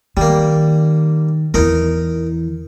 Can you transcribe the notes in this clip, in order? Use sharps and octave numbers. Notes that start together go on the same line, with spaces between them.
D#3 G3 A#3
E2 E3 D#4 A#4